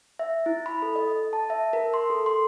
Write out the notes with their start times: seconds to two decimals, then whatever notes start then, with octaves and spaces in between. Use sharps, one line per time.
0.19 E5
0.46 E4
0.66 B5
0.82 A4
0.96 D#5
1.33 A5
1.50 E5
1.73 A#4
1.94 C6
2.10 A4
2.26 C6